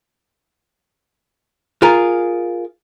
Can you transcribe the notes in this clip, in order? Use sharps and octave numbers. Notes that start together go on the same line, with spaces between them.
F4 G#4 A#4